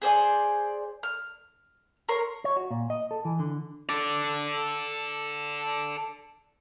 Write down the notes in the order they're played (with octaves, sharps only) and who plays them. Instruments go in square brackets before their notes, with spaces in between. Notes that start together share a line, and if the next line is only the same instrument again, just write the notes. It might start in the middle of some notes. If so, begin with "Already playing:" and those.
[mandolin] G#4 C5 D5 G#5
F6
A#4 C#5 C6
[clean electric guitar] C#5
F#4
A#2
D#5
A4
E3
D3
[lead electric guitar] A4 D5